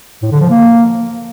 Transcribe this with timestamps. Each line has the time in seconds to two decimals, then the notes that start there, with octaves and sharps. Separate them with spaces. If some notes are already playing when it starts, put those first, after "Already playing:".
0.22 A2
0.31 D3
0.40 F3
0.50 A#3